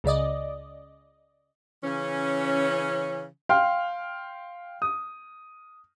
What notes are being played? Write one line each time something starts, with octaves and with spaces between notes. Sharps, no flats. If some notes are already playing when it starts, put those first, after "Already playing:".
C#2 C#3 D5 D#5
C#3 E3 C#4
F5 G5 C6 F6
D#6